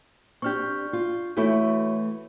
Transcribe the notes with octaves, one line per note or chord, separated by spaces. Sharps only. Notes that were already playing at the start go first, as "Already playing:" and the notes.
C4 D4 G4 C#6 F6 G6
F4
E3 A3 E4 F#4 C#5 C#6